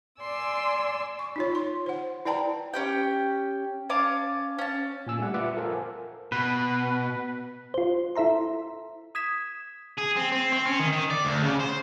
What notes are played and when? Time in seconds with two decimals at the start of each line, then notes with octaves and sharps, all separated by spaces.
0.21 D5 G#5 C6 E6
1.19 C#6
1.36 D#4 F4 C#5
1.55 C6
1.86 C5 F#5
2.25 E4 B4 D5 G5 A5 A#5
2.74 C#4 G4 G5
3.89 C#4 F5 A5 D6
4.58 C#4 A5
5.07 A#2 G#5 E6
5.18 G3 A3 D4 G4 D5 F#5
5.34 F4 B4 E5 F#5 D6
5.56 F4 A4 A#4 C5 F5 G#5
6.32 B2 B4
7.74 F4 C5
8.15 E4 A4 E5 A#5 C6
9.15 D#6 G#6 B6 E7
9.98 G#4
10.17 C4
10.32 C4
10.53 C4
10.66 C#4
10.80 D#3
10.92 D#3
11.10 D5
11.25 D2
11.43 C#3
11.60 C5